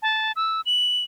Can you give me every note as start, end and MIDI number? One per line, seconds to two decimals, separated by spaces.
0.02 0.32 81
0.36 0.61 88
0.66 1.04 102